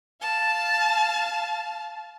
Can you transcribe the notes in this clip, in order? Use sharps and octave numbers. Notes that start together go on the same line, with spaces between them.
F5 A5